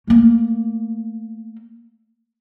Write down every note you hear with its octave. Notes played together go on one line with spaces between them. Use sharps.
A3 A#3